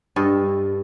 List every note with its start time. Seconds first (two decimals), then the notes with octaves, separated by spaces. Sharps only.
0.16 G2 A4 D#5